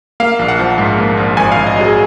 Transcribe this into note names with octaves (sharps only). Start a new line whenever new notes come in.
A#3 F5
A#1
F#5
F3
G#2
A#3
A#1
G#1 G#5
G#1 F5
D#5
F#3 G#4